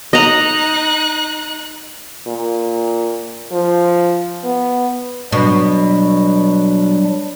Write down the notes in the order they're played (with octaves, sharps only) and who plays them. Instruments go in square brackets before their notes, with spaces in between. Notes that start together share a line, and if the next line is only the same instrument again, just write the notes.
[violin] D#4 F#6 [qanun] D#5 A#5
[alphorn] A#2
F3
B3
[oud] B2 [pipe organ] F#3 G3 D4